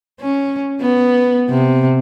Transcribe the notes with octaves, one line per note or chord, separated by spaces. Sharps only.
C#4
B3
C3